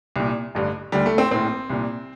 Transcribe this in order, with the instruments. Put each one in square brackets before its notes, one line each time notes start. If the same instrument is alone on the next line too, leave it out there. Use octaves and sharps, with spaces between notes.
[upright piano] C2 A#2
A1 G2 D3
D2 D3 G3
A3
C4
A#1 A2 C4
C2 A#2